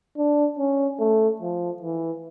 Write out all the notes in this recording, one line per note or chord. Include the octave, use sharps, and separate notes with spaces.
D4
C#4
A3
F3
E3